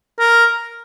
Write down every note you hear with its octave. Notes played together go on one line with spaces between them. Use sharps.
A#4